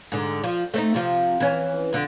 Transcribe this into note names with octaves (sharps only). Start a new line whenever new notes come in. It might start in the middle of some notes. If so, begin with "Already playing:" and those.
G#2 D3
F3
A3 C4 D#4
C3 F3
E3 C#4
F2 D3